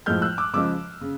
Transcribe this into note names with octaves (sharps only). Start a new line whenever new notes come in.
A2 F3 G#3 F6 G6
E6 F#6
D6 E6
C#3 F3 G#3 D6 E6
C#3